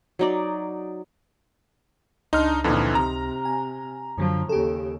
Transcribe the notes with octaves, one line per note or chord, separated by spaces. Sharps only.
F#3 D#4 D5
C#2 D4 D#4 C6 F6
F2 A#2 D3 E3 D#4
C3 A#5
G#5
F#2 D3 F3 F#3
D#2 C#3 G4 A4